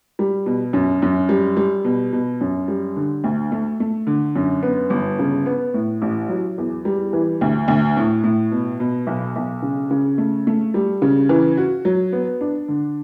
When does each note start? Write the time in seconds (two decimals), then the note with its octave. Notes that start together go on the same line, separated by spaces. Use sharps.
0.19 G3
0.46 B2
0.73 F#2
1.02 F#2
1.29 G3
1.57 G3
1.84 B2
2.13 B2
2.41 F#2
2.68 G3
2.96 D3
3.24 D2
3.52 A3
3.80 A3
4.07 D3
4.36 F#2
4.63 B3
4.90 G1
5.19 C#3
5.46 B3
5.74 A2
6.02 A1
6.29 F#3
6.58 E2
6.85 G3
7.13 E3
7.41 D2
7.68 D2
7.97 A2
8.24 A2
8.51 B2
8.80 B2
9.07 B1
9.36 B1
9.62 C#3
9.91 C#3
10.18 A3
10.47 A3
10.74 G3
11.02 C#3
11.29 E3
11.57 F#4
11.85 F#3
12.13 B3
12.41 D4
12.68 D3